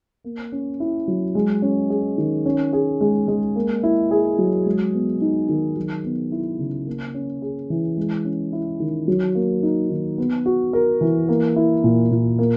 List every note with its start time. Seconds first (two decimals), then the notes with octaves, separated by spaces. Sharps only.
0.24 A#3
0.52 C#4
0.80 E4
1.08 F#3
1.35 G#3
1.62 C#4
1.90 G#4
2.18 D#3
2.46 C#4
2.73 G#4
3.01 G#3
3.28 G#3
3.56 A#3
3.83 E4
4.11 G#4
4.39 F#3
4.66 G#3
4.93 B3
5.21 D#4
5.49 D#3
5.76 F#3
6.04 B3
6.32 E4
6.59 C#3
6.86 A#3
7.14 C#4
7.42 G#4
7.70 E3
7.97 G#3
8.25 C#4
8.53 E4
8.80 D#3
9.08 F#3
9.35 A#3
9.63 D#4
9.90 D#3
10.18 B3
10.46 F#4
10.73 A#4
11.01 E3
11.29 A#3
11.56 E4
11.84 A#2
12.11 A#2
12.39 A#3